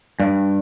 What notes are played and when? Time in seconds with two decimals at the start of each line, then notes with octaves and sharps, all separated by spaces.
0.20 G2